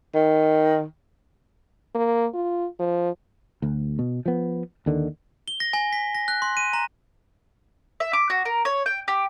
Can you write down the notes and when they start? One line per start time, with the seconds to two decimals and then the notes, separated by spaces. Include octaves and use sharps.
0.15 D#3
1.95 A#3
2.34 F4
2.79 F3
3.62 D2
3.99 B2
4.26 F3 B3
4.86 D#2 D3 D#3
5.48 G7
5.60 A#6
5.73 G#5
5.93 B6
6.15 A#6
6.28 F#6
6.42 C6
6.57 D#7
6.73 A#5
8.00 E5
8.13 D6
8.30 F#4
8.45 A#4
8.65 C#5
8.86 G5
9.08 G4